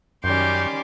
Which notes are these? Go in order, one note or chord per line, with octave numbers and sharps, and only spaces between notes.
F#2 D#3 G3 C#4 C6 D6 G6